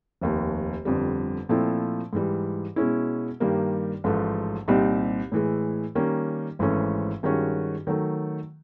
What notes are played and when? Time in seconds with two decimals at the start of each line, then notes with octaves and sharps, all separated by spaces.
0.22 F1 D#2 D#3
0.85 G1 F2 D3 G3
1.49 A#2 F3 A3 C4 E4
2.13 G#2 E3 G3
2.76 B2 G#3 C#4 E4
3.40 G2 D#3 G3 A#3
4.04 A1 G#2 F3 A3
4.68 C2 A#2 G3 C4 D#4
5.32 A2 E3 G#3
5.95 D#3 G3 A#3 C#4
6.59 G#1 G#2 E3 A3 C#4
7.23 G2 D#3 G#3 C#4 F#4
7.87 D#3 F#3 A3